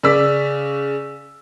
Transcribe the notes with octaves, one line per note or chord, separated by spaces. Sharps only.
C#3 D5 E6 B6